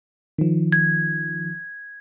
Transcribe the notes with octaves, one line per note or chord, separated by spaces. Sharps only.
D#3 F3
G#6